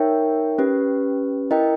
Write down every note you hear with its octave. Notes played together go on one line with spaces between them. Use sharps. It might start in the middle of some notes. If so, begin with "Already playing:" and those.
Already playing: D#4 A#4 C#5 E5 G5
C#4 G4 B4
E4 A#4 D#5 G5